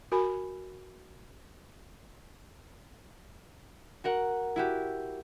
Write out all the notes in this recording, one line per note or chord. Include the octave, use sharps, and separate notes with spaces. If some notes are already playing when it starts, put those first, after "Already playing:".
F#4 A#4 G#5 B5
F#4 A#4 F#5
E4 F#4 G4